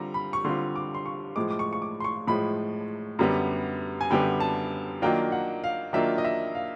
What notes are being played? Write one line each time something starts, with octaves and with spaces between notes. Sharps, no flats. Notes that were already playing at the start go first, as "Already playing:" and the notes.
Already playing: D3 G3 C4 F4 A#5
B5
C#6
D3 G3 C4 F4 C6
D6
C6
C#6
A2 F3 G#3 D6
D6
C#6
C#6
D6
C6
C#6
A2 F3 G#3 B5
F#2 D3 G3 B3
G#5
F#2 D3 G3 B3 G5
A5
D#3 F#3 A#3 D4 F4 G5
F#5
F5
D#3 F#3 A#3 D4 F4 E5
D#5
E5
F5